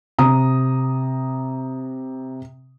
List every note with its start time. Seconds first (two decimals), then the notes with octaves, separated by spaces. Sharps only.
0.18 C3 A#5 D#6